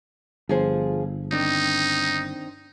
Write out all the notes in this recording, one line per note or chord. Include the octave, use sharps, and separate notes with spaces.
G1 F3 G#4 C5
D#3 C4 D4 D#4